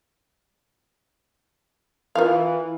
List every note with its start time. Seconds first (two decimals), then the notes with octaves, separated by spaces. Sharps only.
2.15 E3 F4 A#4 F5